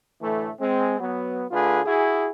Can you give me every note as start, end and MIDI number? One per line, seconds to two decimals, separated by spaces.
0.21 0.50 45
0.21 0.50 50
0.21 0.50 52
0.21 0.50 57
0.60 0.95 56
0.60 0.95 60
0.99 1.45 54
0.99 1.45 59
1.51 1.80 50
1.51 1.80 57
1.51 1.80 65
1.51 1.80 68
1.51 1.80 71
1.85 2.29 64
1.85 2.29 66
1.85 2.29 68